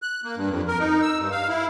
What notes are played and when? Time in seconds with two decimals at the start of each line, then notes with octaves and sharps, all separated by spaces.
0.02 F#6
0.24 A#3
0.36 G2
0.49 F2
0.67 A#4
0.80 D#4
1.02 E6
1.19 G2
1.32 F5
1.48 E4